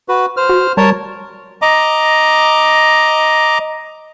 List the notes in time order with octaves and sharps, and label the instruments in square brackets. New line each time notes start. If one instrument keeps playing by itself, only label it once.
[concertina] F#4 B4
C5 F6
[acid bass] F#4
[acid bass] G3 [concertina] A#4 C#5 A5
[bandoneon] D#5 A#5 D6